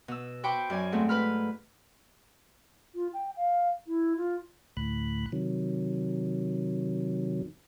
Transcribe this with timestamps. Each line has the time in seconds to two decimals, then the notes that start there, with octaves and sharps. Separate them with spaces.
0.08 B2 E6
0.43 F#4 C5 G5 B5 C#6 D6
0.70 F#2 D5 G#5
0.92 G#2 A3 C4
1.09 B4 B5 F6
2.95 F4
3.13 G5
3.36 F5
3.87 E4
4.16 F4
4.77 D2 A2 B5 F#6
5.32 C3 D#3 F#3